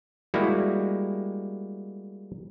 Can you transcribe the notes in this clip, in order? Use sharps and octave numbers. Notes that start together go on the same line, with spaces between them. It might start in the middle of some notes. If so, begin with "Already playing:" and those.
G3 G#3 A#3 E4 F#4